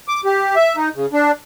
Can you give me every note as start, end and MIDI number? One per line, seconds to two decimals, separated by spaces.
0.08 0.21 86
0.25 0.55 67
0.56 0.76 76
0.76 0.89 63
0.95 1.06 49
1.13 1.32 62